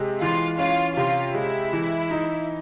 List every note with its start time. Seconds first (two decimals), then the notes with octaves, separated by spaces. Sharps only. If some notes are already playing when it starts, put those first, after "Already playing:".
Already playing: C3 G#3
0.21 E3 F4
0.58 C#4 F4
0.96 C3 F4
1.35 G#3 E4
1.73 E3
2.11 D#4